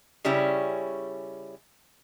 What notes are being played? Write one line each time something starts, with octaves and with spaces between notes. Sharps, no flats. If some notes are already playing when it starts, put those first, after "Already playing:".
C#3 G3 C#4 E4